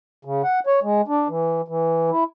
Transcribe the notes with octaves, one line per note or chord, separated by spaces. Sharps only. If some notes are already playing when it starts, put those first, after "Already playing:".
C#3
F#5
C#5
G#3
D4
E3
E3
E4